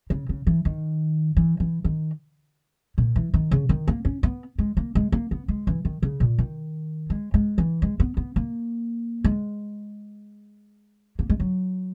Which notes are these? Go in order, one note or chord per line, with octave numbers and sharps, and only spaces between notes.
C#3
C#3
E3
D#3
E3
E3
D#3
A#2
E3
D#3
C#3
D#3
A#3
C#4
B3
G#3
A#3
G#3
A#3
B3
G#3
E3
D#3
C#3
A#2
D#3
G#3
G#3
E3
G#3
B3
B3
A#3
G#3
A#3
G#3
F#3